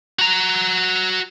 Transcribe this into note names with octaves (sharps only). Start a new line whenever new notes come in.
F#4 A#5